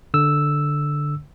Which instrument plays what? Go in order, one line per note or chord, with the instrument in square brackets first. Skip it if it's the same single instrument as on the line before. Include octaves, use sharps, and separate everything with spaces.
[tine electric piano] D3 E6